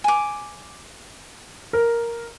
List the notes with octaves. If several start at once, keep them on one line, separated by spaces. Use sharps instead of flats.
G#5 D6
A#4